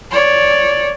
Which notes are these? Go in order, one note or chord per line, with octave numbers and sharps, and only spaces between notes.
C#5 D5